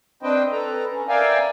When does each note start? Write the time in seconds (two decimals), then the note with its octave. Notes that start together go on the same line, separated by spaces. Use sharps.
0.23 C4 D4 B4 C5 D#5 G5
0.52 A4 B4 A#5
0.92 C#4
1.09 A#4 D5 E5 F5 G5 G#5